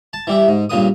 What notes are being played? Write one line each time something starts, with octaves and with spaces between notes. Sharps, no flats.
A5
E3 G3 E4
G#2
G2 A#2 C#3 B4 D#6